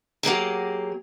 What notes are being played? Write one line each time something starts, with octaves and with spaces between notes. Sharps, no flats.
F#3 A#3 G4 G#4